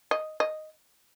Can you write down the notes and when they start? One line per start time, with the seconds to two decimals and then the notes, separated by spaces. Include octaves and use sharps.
0.11 D#5
0.40 D#5